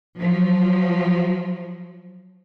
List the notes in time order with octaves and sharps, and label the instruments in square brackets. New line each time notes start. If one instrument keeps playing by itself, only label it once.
[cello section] F3 F#3